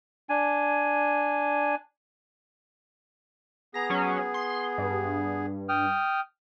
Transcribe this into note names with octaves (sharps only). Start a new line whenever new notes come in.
D4 G#5
B3 G#4 A#5 A#6
F#3 C#4
C6
G2
G5 D#6 F6